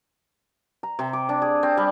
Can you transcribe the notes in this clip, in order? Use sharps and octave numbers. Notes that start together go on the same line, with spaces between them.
A#5
C3
D6
D4
G#4
C4
G3